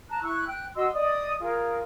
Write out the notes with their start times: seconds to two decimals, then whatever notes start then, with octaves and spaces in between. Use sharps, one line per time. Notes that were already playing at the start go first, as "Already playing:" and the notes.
0.09 A5 A#5 F#6
0.23 E4 C#6 E6 F#6
0.46 G5 F#6
0.75 F#4 D#5 C6 E6
0.93 D5 D#5 D#6
1.40 F4 G#4 A#4